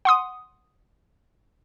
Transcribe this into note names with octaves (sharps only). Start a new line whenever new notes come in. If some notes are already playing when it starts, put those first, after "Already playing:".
F#5 C6 D#6